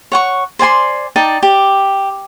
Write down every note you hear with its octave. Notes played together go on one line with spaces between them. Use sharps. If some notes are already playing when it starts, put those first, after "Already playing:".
C#5 F#5 C#6
C5 D5 G#5 C6
D#4 D5 G5 A5
G4